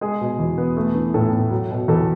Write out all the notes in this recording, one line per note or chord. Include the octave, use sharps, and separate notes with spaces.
G#3 G#4
B2
E2
B3
A3
E3
A2 A4
A2
F#3
B2
E2 A4